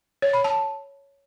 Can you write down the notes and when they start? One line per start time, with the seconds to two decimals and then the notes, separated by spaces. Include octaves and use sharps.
0.22 C#5
0.33 B5
0.44 A5